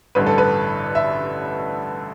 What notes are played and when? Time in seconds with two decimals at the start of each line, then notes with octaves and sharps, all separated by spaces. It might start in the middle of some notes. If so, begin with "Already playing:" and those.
0.15 A1 G2 D3 B4
0.26 A4
0.38 B4
0.95 E5